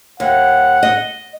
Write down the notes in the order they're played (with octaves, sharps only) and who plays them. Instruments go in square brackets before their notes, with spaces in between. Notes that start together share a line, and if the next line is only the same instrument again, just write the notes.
[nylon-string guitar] D#2 [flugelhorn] F#5
[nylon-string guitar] D#5